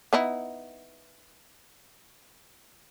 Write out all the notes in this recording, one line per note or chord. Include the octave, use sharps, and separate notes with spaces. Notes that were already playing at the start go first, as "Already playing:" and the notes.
B3 D#4 E4